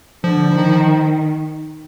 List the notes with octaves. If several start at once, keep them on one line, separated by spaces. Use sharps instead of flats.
D3 F3
D#3